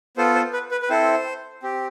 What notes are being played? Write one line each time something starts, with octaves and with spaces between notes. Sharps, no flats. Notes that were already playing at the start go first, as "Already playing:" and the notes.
B3 F4 A4 C5
C5
B4
B4
B4
C4 E4 A4 C5
C4 G4